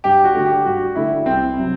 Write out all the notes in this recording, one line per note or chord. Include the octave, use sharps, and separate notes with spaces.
G2 G4
F#4
D3 A3
G4
G2 F#4
D3 A3 E4
C2 C4
C3 F#3